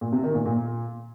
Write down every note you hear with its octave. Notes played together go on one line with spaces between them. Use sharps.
A#2
C3
D#3
A#2
A#2